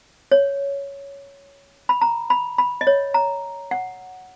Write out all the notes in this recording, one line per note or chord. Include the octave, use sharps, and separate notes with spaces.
C#5
B5
A#5
B5
B5
D#5
C#5
A#5
F#5